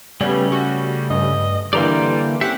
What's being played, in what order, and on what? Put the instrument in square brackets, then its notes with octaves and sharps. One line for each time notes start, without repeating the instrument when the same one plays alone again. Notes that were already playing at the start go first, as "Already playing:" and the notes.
[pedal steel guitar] C#3 A3 C#4 [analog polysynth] G3 B3
[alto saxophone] G3 [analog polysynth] F#4
[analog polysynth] G2 [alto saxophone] D#5
[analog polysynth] D3 E3 A#3 [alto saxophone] G3 [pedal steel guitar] D5 A#5 C6
[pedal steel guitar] C4 C#4 E5 [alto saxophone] G4 [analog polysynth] F#5